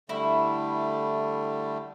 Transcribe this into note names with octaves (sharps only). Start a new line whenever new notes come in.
D3 G3 A3 E4